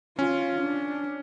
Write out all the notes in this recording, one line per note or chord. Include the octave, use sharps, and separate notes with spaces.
C#4 F4
D4